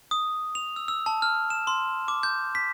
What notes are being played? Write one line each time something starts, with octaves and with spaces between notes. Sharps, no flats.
D#6
F7
E6
E6
A5
F6
E7
C6
D6
G6
B6